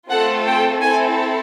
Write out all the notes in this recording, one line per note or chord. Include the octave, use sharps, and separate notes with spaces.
A3 C4 F4 A4 F#5
G5
C4 E4 A4 G#5